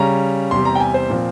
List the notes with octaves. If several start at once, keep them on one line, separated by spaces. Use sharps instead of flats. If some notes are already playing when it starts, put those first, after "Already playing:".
Already playing: C#3 G3 C#4 A#5
E2 C3 G3 C6
A#5
G5
G#5
C5
A#2 F3 C4